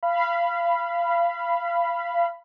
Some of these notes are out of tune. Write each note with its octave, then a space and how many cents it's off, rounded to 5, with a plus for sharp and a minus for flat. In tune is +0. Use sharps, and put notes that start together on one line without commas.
F5 -30 B5 +0